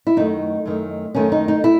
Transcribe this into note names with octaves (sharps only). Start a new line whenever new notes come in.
E4
F#2 D#3 A3 D#4
F#2 D#3 A3
F#2 D#3 A3 C#4
D#4
D#4
E4